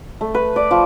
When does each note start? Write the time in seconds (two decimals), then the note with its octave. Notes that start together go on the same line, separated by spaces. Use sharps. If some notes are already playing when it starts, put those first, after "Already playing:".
0.21 A3
0.34 B4
0.56 D5
0.71 F3